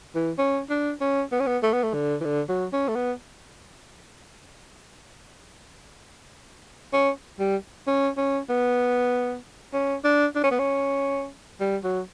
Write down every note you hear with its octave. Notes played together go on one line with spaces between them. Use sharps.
E3
C#4
D4
C#4
B3
C#4
B3
A3
B3
A3
D3
E3
D3
F#3
C#4
A3
B3
C#4
G3
C#4
C#4
B3
C#4
D4
D4
C#4
B3
C#4
G3
F#3